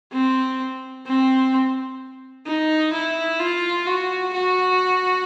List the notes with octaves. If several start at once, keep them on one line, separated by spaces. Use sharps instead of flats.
C4
C4
D#4
E4
F4
F#4
F#4